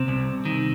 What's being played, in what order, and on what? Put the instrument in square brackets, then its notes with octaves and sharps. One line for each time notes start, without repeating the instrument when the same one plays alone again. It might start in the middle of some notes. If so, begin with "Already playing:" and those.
Already playing: [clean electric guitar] C3 C4
C2
D#3